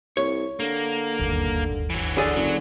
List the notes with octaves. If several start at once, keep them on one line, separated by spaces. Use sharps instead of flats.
C2 C#5
D3 A#3
D1 G1 D#2
E3 F#3
D3 G#4 D5
F#1 F#3